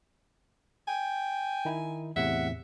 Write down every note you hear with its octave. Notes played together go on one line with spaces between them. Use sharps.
G5 G#5
D#3 D#4 E4
E2 A2 C3 E5 F#5